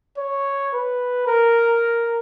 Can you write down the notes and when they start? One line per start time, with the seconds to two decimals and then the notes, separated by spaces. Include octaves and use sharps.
0.18 C#5
0.73 B4
1.27 A#4